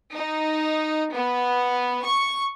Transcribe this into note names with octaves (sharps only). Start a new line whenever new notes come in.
D#4
B3
C#6